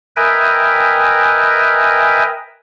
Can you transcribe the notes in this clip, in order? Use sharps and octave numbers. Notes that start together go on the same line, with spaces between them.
A#4 B4 D#5 E5 G5 G#5